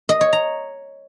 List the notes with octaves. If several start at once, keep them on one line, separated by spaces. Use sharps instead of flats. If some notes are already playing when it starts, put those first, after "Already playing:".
D#5
C#5
A#5